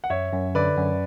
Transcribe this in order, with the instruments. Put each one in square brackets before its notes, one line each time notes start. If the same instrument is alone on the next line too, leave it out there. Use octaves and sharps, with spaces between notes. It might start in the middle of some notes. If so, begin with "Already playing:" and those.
[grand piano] F#5
[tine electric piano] F#2 [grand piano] C#5 E5
[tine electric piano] F#2
[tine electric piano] D3 [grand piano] B4 D5
[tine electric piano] F#2